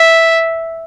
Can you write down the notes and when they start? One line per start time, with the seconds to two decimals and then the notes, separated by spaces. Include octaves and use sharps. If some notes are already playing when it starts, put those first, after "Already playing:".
Already playing: E5